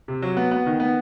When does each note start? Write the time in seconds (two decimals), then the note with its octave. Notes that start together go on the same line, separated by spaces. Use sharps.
0.08 C3
0.22 F#3
0.37 B3
0.51 B3
0.66 D#3
0.80 B3